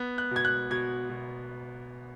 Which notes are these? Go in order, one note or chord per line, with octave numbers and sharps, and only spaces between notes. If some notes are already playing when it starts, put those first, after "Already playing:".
Already playing: B3
F#6
B2 G#6
F#6
B2 G#6
B2